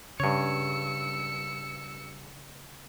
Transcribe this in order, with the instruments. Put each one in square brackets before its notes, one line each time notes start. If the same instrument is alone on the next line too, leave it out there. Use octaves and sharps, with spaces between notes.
[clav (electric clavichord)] G2 C#5 [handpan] C#3 [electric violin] E6 C#7